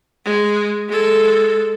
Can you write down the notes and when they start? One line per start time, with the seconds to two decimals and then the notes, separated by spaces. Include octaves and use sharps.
0.25 G#3
0.88 G#3 A4